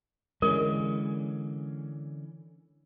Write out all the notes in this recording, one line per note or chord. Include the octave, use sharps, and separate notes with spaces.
D3 E3 G#3 C#4 A#4